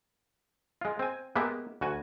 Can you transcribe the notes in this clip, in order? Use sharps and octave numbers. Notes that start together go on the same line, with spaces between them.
G#3 F4
C4 G#5
G#3 A#3 B3 G4 D#5 E5
D2 F#4 G#5